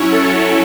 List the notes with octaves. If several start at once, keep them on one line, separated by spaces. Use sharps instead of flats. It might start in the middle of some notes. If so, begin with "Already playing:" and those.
Already playing: F#3 C#4 E4 C#5
A4